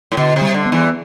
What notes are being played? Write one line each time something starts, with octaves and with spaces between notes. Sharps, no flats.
A2
B2 D3
C3
G3
D3
B3
E2 E3